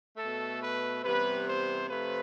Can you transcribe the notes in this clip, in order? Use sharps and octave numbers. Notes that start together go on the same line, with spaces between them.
B2 A3 A4
B4
C3 E3 G3 B3 B4
C5
C3 F3 A3 B4